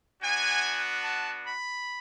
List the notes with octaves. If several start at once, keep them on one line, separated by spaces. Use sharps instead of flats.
B3 D4 F#4 G#5
A5
B5